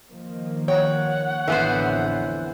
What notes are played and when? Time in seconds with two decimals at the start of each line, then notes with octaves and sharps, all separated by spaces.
0.10 D#3 F3 A#3
0.68 C#5 F#5 G5
1.48 A1 F2 D3 E3 B3 C5